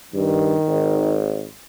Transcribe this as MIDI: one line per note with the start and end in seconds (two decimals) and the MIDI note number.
0.14 0.55 43
0.14 1.22 51
0.68 1.45 32